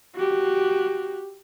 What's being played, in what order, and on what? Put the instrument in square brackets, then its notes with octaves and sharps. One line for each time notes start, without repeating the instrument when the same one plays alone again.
[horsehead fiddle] F#4 G4